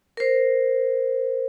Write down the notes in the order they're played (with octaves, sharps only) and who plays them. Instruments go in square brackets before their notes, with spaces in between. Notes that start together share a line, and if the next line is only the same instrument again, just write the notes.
[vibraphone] A#4 C5